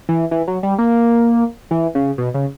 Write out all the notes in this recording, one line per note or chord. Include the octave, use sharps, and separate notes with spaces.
E3
E3
F#3
G3
A#3
E3
C#3
B2
C#3